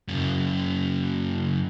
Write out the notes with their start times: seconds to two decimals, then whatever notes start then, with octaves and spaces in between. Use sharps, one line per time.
0.08 F#2 C#3